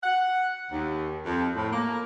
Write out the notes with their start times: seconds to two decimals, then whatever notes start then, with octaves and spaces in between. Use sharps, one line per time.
0.04 F#5
0.71 D#2
1.26 F2
1.55 A2
1.71 A#3